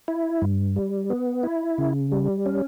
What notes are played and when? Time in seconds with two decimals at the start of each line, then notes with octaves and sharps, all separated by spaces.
0.08 E4
0.42 G2
0.76 G3
1.10 B3
1.43 E4
1.78 C#3
2.12 G3
2.46 C#4